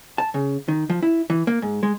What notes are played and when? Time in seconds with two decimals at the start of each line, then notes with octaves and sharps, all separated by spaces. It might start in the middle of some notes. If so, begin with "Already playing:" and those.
0.18 A5
0.34 C#3
0.68 D#3
0.90 F3
1.03 E4
1.30 E3
1.47 A#3
1.62 G#2
1.83 G#3